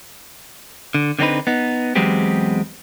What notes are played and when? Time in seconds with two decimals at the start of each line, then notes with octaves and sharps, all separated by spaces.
0.94 D3
1.19 D3 B3 C4 D#4 B4
1.47 B3 D#4
1.95 E2 F#3 G#3 B3 C4 G4